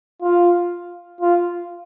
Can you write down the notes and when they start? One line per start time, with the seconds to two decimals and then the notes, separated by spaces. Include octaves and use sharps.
0.22 F4
1.21 F4